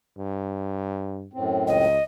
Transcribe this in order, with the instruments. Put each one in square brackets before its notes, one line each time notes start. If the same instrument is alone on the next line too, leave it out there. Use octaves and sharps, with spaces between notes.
[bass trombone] G2
[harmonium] F#2 A2 C4
[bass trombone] C#2 [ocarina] D#5